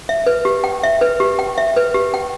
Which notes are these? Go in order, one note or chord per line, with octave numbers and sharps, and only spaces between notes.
E5
B4
G4
G5
E5
B4
G4
G5
E5
B4
G4
G5